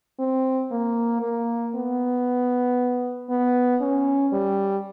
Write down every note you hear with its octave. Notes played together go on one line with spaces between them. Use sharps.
C4
A#3
A#3
B3
B3
C#4
G3